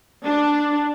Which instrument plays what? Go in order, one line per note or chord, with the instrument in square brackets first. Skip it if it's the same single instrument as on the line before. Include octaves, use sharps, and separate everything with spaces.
[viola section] D4